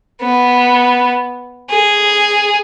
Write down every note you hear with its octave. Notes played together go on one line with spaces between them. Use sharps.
B3
G#4